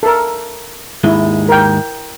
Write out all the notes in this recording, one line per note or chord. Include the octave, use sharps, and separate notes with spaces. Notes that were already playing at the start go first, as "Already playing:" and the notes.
A4 A#4
D#2 G#2 G#3 E4
A#4 G5